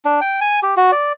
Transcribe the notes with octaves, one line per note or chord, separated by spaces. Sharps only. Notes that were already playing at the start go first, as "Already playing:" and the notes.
D4
G5
G#5
G4
F#4
D5